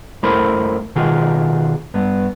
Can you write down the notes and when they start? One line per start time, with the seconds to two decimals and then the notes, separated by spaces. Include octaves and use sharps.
0.23 F#2 A3 E4 A#4 C5 B5
0.95 B2 D#3 F4 F#4 G#4
1.94 G2 B3